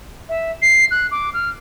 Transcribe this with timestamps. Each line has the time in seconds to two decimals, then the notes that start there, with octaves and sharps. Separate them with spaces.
0.29 E5
0.62 C7
0.91 F#6
1.11 D6
1.33 F6